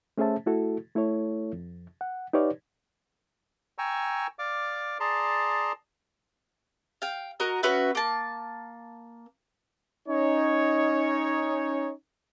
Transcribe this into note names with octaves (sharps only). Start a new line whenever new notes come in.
A3 C#4 G#4 C5 E5 A5
A3 E4 F#4 A4
A3 E4 A4 C#5
F2
F#5
D#4 G4 B4 C#5 D5 F5
G5 G#5 A#5 C#6 E6
D5 F5 D6
G#4 D5 A5 A#5 C6
F5 G5
F#4 A#4 D#5
C#4 F#4 B4 E5
A#3 A5
C#4 D#4 C#5